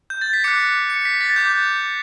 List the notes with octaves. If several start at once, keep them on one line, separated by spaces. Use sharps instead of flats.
G6
A6
B6
D6 F#6 C#7
C#7
B6
A6
D6 F#6 G6
G6